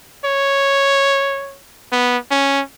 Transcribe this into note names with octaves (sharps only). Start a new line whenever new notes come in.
C#5
B3
C#4